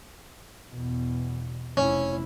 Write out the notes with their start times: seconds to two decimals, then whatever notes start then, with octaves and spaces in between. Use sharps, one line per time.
0.71 E2 B2
1.77 F1 C#4 E4